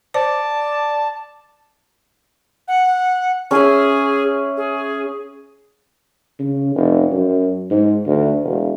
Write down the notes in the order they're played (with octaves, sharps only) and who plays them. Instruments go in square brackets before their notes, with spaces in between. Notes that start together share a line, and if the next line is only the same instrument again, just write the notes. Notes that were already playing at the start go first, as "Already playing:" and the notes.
[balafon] C5 [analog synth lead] D5 [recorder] A5
[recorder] F#5
[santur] C#4 E5 [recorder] G#4
[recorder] G#4
[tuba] C#3
F1
F#2
G#2
D2
E1